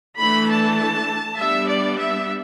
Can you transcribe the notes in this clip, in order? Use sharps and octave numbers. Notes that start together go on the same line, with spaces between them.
E3 A3 D4 B5
A5
G3 B3 D4 E5
D5
E5